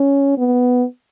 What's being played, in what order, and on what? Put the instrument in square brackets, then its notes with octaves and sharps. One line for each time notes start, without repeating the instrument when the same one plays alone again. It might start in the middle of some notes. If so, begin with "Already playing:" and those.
Already playing: [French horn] C#4
B3